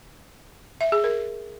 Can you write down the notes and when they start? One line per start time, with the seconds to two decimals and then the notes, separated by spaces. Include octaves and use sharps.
0.81 E5
0.92 G#4
1.04 A#4